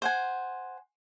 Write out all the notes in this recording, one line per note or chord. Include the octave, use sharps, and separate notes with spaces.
C5 F#5 G#5